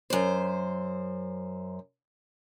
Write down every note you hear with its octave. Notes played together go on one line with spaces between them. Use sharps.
F#2 C5